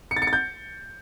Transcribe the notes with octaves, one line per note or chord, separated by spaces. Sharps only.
C#7
A6
C#7
A6
G6